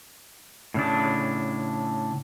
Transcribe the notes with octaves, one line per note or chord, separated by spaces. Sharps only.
A2 C#3 D4